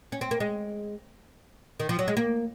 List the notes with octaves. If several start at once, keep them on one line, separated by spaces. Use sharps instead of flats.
C#4
C4
A#3
G#3
D#3
F3
F#3
G#3
A#3